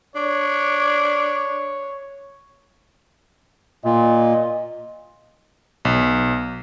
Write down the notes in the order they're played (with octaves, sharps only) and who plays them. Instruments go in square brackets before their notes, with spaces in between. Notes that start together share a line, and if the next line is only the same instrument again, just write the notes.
[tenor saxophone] D4 [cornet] C#5
[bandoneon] A#2 [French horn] D#5
[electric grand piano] B1